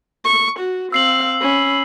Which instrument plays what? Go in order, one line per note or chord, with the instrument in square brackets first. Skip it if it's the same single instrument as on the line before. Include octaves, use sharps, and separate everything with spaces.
[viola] C#6
F#4
[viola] C4 F5 [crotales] E6 C7 F#7
[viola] C#4 B5